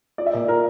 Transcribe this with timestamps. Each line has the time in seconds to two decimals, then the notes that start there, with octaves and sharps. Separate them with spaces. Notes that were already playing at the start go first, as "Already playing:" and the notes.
0.18 F4 D5
0.26 E5
0.33 A#2 D5
0.48 F4 A#4